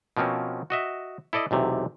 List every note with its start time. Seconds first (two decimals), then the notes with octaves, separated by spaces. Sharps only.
0.17 B2 F3 A#3 C4 C#4
0.70 F#4 D#5 E5
1.33 E4 A4 D5 D#5
1.51 B1 E2 C3 A3